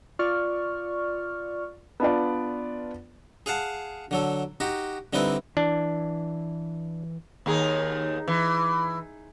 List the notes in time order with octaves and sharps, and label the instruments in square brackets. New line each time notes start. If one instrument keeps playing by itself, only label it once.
[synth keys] F4 D5 C#6 F6
[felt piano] B3 D4 F4 D5
[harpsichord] G#4 F5 F#5 A5
D3 F#3 A4
D#4 F#4 G4
D3 G3 C4 D#4 E4 B4
[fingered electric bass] E3 [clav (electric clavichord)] D4
[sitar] D#2 D#4 G#4
E3